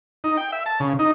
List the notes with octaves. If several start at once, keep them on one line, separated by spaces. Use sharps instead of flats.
D#4
G5
E5
A5
C#3
D#4